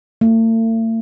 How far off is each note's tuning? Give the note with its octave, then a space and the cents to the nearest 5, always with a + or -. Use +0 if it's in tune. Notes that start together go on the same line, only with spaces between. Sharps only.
A3 +45